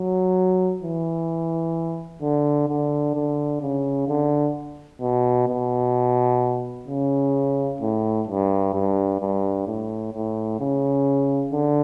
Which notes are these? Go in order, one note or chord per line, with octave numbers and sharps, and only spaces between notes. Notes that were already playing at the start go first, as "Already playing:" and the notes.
Already playing: F#3
E3
D3
D3
D3
C#3
D3
B2
B2
C#3
A2
G2
G2
G2
A2
A2
C#3
D3